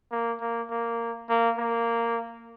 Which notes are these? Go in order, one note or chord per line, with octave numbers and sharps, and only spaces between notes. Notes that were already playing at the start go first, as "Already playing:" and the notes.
A#3
A#3
A#3
A#3
A#3